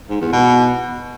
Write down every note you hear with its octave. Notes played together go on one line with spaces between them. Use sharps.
G#2
E2
B2